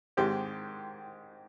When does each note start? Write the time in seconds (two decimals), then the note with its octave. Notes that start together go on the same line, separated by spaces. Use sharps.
0.17 G#2 D#3 G#3 C4 G4